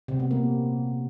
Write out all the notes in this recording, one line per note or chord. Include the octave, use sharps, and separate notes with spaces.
C3
B3
A#3